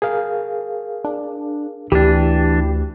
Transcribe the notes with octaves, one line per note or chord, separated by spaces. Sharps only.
G#4 A#4 F5
D4
D2 E3 D4 G4